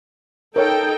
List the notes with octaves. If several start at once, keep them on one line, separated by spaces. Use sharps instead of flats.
D#4 A4 A#4 C#5 G5